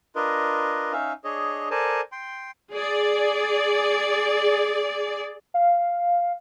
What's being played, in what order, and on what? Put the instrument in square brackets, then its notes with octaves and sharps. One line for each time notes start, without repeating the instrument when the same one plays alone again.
[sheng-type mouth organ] D4 F4 A#4 B4 D#5
C#4 D#4 E5 F5
D4 G#4 C#5 D#5
A4 A#4 C5 D5 G#5 A5
G5 C6
[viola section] G#4 D5
[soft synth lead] F5